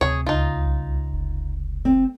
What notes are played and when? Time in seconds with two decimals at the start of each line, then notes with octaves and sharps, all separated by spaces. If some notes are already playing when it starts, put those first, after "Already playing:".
0.01 D2 C3 G#4 C#5
0.27 C#2 D#4 F4
0.65 C2
1.12 F1
1.85 C4